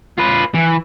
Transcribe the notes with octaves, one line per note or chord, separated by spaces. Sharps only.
F4 B4
E3